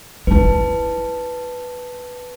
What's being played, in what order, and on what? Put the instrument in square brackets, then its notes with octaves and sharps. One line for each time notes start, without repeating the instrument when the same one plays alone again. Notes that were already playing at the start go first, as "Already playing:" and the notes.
[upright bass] D#4 E4 [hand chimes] B4 A5